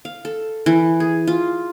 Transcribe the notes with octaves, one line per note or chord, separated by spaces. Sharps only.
F5
A4
E3
G#4
F4